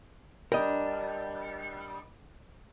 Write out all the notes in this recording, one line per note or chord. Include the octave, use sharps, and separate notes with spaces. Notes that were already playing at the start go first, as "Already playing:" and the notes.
G3 D4 A#4 D#5